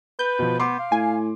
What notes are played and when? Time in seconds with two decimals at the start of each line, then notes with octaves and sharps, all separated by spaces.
0.19 B4 G6
0.39 B2 F3
0.60 B3 C6 D6
0.79 F5
0.92 A2 G#5